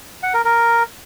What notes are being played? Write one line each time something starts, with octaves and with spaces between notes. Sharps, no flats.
F#5
A#4
A#4